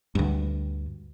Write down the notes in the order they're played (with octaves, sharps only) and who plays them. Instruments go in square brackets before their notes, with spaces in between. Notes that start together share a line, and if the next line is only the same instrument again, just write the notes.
[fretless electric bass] D2 G2